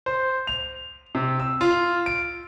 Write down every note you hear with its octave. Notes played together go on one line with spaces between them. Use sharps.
C5
F7
C3
E6
F4
D7